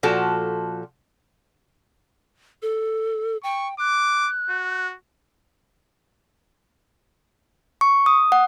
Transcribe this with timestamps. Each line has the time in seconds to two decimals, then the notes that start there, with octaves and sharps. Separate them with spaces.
0.03 A#2 F3 F#4 A4
2.62 A4
3.43 G5 C#6
3.79 D6 F#6
4.49 F#4
7.81 C#6
8.06 D#6
8.32 F#5